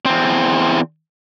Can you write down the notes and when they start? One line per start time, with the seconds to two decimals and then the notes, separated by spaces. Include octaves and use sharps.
0.06 E2 C4